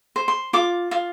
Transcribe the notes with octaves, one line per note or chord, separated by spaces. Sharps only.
C5
C6
F4 D6
F4